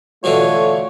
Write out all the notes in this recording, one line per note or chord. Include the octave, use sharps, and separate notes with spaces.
B2 D3 E3 A3 F4 C#5